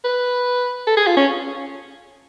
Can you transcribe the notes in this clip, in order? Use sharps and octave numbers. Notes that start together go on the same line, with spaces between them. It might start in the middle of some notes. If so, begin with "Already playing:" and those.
B4
A4
G#4
F4
C#4